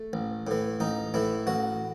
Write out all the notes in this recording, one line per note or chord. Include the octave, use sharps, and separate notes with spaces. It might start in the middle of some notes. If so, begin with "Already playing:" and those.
Already playing: A3
A1
A2 E3
A1 D#4
A2 E3 E4
A1 F#4